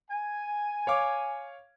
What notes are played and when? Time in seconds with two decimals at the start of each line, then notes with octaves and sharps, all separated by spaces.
0.10 G#5
0.87 C#5 F5 D6